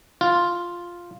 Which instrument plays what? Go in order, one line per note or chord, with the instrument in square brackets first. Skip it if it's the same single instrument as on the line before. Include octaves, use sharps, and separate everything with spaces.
[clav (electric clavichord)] F4